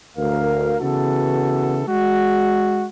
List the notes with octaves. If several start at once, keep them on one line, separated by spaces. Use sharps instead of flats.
D2 A#4 F5
C#3 E3 B3 F#4 A4
G#3 F#4